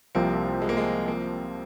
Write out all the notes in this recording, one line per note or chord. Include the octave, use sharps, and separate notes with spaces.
C2 C3 F3 A#3 C4
G#3
A#3
G#3
A#3